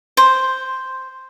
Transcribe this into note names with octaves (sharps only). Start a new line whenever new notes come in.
C5